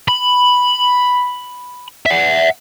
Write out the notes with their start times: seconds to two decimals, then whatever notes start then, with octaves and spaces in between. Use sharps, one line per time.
0.08 B5
2.06 E5 F#5